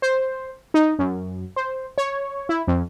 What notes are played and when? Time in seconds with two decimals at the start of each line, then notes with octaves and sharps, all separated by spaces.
0.02 C5
0.74 D#4
0.99 F#2
1.56 C5
1.98 C#5
2.49 E4
2.67 F2